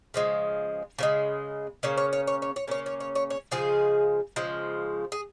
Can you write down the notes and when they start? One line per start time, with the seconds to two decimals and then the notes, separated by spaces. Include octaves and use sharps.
0.14 C#3 F3 G#3
0.99 C#3 F3 G#3
1.83 C#3 A#3 C#4 C#5
1.98 C#5
2.13 C#5
2.27 C#5
2.42 C#5
2.56 C#5
2.68 C#3 A#3 C#4 C#5
2.86 C#5
3.00 C#5
3.15 C#5
3.30 C#5
3.51 C#3 F3 G#3 G#4
4.36 C#3 F3 G#3
5.12 G#4